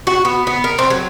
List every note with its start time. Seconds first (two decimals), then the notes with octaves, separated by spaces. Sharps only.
0.07 F#4
0.25 B3
0.47 B3
0.64 A#4
0.79 C4
0.90 F#3